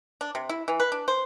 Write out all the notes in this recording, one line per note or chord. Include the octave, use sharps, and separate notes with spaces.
D4
C3
E4
E3
B4
D4
C5